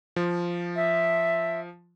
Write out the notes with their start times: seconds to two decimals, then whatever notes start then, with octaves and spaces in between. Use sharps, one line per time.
0.16 F3
0.75 E5